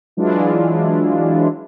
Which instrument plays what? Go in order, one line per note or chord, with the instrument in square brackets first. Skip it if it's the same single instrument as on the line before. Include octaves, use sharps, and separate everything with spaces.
[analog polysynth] E3 F#3 G#3 D4 E4 F4